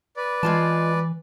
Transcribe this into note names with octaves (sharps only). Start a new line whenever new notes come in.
B4 D5
E3 G#3 F4 A5